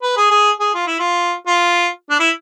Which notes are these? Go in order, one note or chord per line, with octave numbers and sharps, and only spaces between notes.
B4
G#4
G#4
G#4
F4
E4
F4
F4
D4
E4